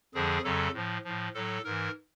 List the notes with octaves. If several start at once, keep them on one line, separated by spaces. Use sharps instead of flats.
F2 D3 F3 G#4
F2 C#3 F#3 A4
A2 F3
A2 F3
A2 F#3 A4
G#2 E3 A#4